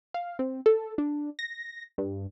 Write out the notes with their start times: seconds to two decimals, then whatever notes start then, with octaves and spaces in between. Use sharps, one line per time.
0.14 F5
0.39 C4
0.66 A4
0.98 D4
1.39 A#6
1.98 G2